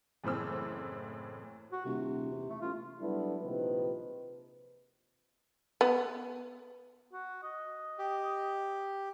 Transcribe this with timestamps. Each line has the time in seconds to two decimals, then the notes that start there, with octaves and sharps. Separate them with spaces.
0.24 F#1 A2 E3 C4 E6
1.72 F#4
1.85 D#1 C3
2.31 E2
2.50 A3
2.62 A1 F4
3.01 F#3 G3 A3 B3 D4 E4
3.42 A#1 C3 D#3 F3 B4
5.81 B3
7.13 F#4
7.43 D#5
7.99 G4